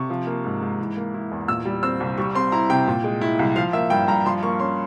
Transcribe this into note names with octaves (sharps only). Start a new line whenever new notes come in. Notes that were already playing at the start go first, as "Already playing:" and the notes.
Already playing: C3 C#6
F3
A#3
G#2
G#2
E3
A#3
E4
E2
A#2 E6
G3
C4 E6
C2
G3 C#6
C4 C6
E4 A#5
C3 G5
A#2
G#3
E4
C2
F3 F5
A#3 E5
G2 G5
G2 A#5
F3 C6
A#3 C#6
C#4 C6